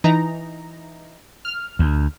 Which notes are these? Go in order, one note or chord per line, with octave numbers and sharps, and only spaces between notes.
E3 D#4 A#5
F6
D2